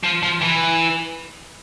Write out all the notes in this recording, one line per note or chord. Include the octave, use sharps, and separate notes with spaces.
F3
F3
E3